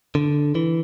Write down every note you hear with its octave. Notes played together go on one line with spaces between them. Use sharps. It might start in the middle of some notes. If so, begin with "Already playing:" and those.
D3
E3